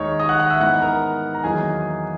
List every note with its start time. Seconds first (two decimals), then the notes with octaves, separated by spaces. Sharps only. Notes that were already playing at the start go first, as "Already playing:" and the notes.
Already playing: D#2 D#3 G#3 D#4 C#5 C#6
0.19 D#5 D#6
0.29 F#5 F#6
0.39 F#5 F#6
0.50 E5 E6
0.60 G#2 E3 B3 D#4 F#5 F#6
0.82 A#4 A#5
1.35 A#5
1.43 E2 D#3 F#3 A#3 D#4 G#4 G#5